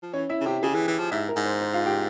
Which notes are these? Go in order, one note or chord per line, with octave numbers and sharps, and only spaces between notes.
F3
E3 C#4 C#5
E4 E5
C#3
C3 G4 G5
C#3 G#4 G#5
E3
E3
F3
G#2 E4 E5
A#4
G#2
C5
C5
F4 F5
G4 G5